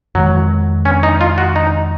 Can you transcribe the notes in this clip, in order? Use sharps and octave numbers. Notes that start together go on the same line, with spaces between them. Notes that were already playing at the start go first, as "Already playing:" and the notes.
F2 D#3 F#3 G#3
C#4
D#4
F4
F#4
D#4